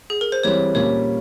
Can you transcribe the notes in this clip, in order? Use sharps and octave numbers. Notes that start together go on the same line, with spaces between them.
G#4
A#4
C5
E3 G3 C4 C#5
A#2 G3 A#3 C#4 C#5